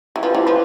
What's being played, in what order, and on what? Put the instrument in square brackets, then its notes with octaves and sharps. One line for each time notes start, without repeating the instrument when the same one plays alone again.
[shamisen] E3
[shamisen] F3 [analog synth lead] B4
[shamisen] E3 [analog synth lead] C5
[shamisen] F3 [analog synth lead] B4